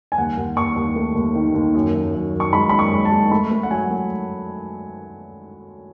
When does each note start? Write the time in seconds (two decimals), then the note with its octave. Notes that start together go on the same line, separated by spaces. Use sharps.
0.12 G#5
0.18 D#2 F#5
0.37 D#2
0.57 D#2 C#6
0.76 D#2
0.96 A3
1.15 D#2
1.35 D#3
1.54 D#2
1.74 F#2
1.94 F#2
2.14 F#2
2.34 F#2
2.40 C#6
2.53 G#3 B5
2.69 F#2 B5
2.79 C#6
2.92 G#3
3.05 A5
3.12 G#3
3.31 A3 B5
3.51 A3
3.63 F#5
3.71 F#3 G#5
3.91 A3